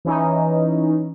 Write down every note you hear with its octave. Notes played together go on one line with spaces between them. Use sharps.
E3 C#4 D#4